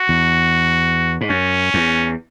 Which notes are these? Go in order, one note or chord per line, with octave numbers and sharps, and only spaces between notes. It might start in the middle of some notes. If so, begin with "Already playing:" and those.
Already playing: F#4
E2
G#2
F#2 C#4
E2